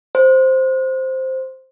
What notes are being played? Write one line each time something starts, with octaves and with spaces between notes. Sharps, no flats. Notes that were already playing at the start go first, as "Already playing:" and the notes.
C5